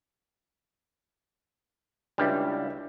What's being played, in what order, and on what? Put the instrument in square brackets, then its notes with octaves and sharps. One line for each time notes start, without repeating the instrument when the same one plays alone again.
[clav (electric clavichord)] C#2 G3 [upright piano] D4 E4